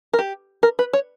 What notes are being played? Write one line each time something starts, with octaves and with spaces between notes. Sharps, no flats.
A#4
G4
A#4
B4
C#5